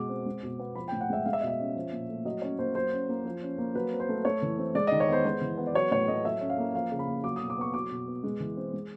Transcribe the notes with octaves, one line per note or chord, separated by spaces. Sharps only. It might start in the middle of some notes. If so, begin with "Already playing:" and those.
Already playing: B2 G#3 D6
C4
G#3
B2
B3
F3 B5
G5
A2
F#5
G#3 E5
G#3 F5
E5
D#5
B2 E5
C#4
F3
A#2
A3
F#3 D#5
C#4 C#5
A#3 C5
F#3 C5
C#4
A#3
F3
C#4
A#3
F#3 B4
C4
C5
A3
A3 C#5
E3
C4
G#3 D5
D#5
D#3
C#5
B3 C5
G#3 C5
E3
B3
D5
F#3 C#5
A2 C#5
A3 D#5
F#3 E5
C#4
F5
A#3
F3 F5
C#3
B5
A#3
F#3 D6
D#6
B2
D6
B3 C#6
F#3 D6
B2
B3
G#3
E3
C4
G#3